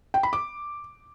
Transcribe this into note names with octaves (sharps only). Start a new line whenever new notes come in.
G5
B5
D6